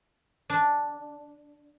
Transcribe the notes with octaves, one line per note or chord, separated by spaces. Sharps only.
D4